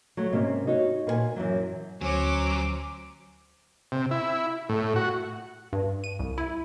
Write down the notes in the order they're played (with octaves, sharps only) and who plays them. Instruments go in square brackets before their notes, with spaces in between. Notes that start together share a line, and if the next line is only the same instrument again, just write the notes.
[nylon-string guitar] F#3 A3
G#2 C3 A#3 C#4
D#4 F#4 C#5
A#2 B4 G#5
F#2 E3 F#3
[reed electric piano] D2 [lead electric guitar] F#3 [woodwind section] C#4 [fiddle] C5 D6
[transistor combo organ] C3
E4
A2
F#4
[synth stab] G2
D#7
C2
E4